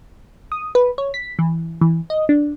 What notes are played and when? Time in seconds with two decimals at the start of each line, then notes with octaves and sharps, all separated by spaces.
0.52 D#6
0.75 B4
0.98 C#5
1.14 B6
1.39 E3
1.81 E3
2.10 D#5
2.29 D4